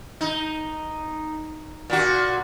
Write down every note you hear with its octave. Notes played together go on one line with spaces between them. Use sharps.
D#4
A#2 F#4